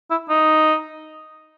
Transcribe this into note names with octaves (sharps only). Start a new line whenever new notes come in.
E4
D#4